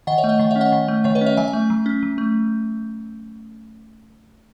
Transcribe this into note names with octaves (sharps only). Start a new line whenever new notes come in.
D#3 D#5 F#5
C#5 E5
A3
D#5 F#5
D#3 F#5
C#5 E5
C#4
D#5 F#5
D#3
A3
D#3 C#5 E5
B4 D#5
C#4
C#5 E5
F#3 E5 G#5
E5 G#5
A3
F#3
C#4
F#3
A3